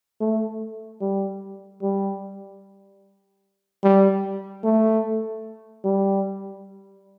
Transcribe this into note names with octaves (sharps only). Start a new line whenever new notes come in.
A3
G3
G3
G3
A3
G3